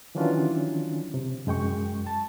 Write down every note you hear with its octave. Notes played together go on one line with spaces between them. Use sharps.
D#3 E3 F#3 C#4 D4 F4
C3
F#2 G#3 G5 C#6
A5